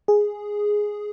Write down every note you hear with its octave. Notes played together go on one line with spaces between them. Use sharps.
G#4